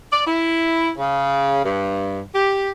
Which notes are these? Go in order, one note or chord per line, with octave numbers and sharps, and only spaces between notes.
D5
E4
C#3
G2
G4